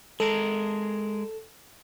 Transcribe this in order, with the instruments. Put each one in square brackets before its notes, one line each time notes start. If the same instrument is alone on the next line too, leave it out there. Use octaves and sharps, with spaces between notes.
[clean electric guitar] G#3 A#4 [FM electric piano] A4